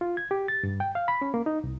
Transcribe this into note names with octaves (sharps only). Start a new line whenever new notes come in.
F4
G#6
G4
A6
G2
G5
F5
B5
C#4
A#3
D#4
C2